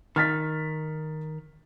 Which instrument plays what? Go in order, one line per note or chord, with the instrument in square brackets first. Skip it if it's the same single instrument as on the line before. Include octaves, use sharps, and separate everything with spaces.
[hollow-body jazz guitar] D#3 [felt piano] F6 A6 B6